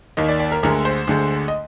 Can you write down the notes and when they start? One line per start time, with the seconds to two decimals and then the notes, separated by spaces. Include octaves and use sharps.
0.17 D#2 D#3 A#3 D#5
0.29 D5
0.40 D5
0.52 A#4
0.63 D2 D3 G#3 A#4
0.85 C5
1.07 D2 D3 G#3
1.48 D#5